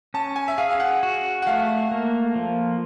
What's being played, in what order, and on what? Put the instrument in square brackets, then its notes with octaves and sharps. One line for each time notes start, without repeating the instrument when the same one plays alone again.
[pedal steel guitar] C#4 [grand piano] A5
[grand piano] G#5
E5
[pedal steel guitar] G#4 [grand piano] F5
[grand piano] F5
F#5
[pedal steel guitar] F#4
[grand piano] F#5
[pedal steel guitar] A3 [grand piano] F5
[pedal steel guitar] A#3
F3